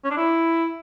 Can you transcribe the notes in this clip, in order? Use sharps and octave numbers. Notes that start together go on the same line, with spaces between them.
C#4
D4
E4